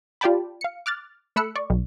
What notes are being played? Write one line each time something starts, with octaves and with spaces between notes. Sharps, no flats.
F4 G4 D5 G5 A5 B5
F5 C#7
D6 F6 F#6 A6
A3 A4 B5 E6 F#6 C#7
D5 C#6
B1